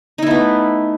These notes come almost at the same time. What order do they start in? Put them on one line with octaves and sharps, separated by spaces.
D#4 E4 B3 A3